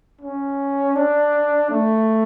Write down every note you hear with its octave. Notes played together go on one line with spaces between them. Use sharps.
C#4
D4
A3